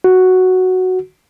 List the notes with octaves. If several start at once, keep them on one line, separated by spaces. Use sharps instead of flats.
F#4